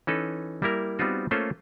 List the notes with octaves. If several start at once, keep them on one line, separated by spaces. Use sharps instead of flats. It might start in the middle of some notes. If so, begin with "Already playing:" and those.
E3 C#4 D#4 A4 B4
G3 A#3 E4 A#4
G3 B3 C4 D#4 F4 F#4
A3 A#3 C#4 F4 A4 C5